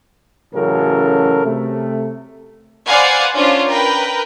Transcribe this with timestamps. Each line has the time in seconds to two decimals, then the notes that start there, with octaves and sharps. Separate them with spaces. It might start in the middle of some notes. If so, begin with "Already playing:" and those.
0.54 A1 C#3 F#3 A4 A#4
1.44 C3 A3
2.87 B4 C5 D5 F5 F#5 G#5
3.35 C#4 D4 F4 C5 C#5
3.68 A#4 B4 G5